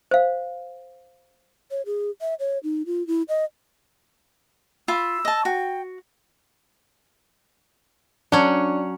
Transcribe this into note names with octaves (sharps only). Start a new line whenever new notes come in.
C5 F5
C#5
G#4
E5
C#5
D#4
F4
E4
D#5
F4 B5 E6
D#5 A5
F#4 G5
F#3 C#4 D4